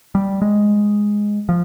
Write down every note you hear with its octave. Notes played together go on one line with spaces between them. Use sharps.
G3
G#3
F3